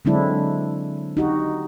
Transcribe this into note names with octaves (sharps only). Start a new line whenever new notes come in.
D3 F#3 G#3 C4 D4 E4
D#4 F#4 G4